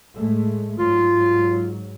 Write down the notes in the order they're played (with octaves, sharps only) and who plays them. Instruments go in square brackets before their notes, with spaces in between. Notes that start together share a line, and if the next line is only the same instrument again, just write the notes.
[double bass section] A2 G#3 A3
[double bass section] G#2 F#3 [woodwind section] F4